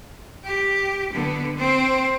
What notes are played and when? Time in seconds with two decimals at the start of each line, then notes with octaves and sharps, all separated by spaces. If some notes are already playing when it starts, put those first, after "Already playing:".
0.44 G4
1.13 D3 B3
1.57 C4